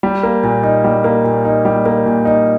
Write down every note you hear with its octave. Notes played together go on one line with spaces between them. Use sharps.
G3
A#3
A#2
D#4
G3
A#3
A#2
D#4
G3
A#3
A#2
D#4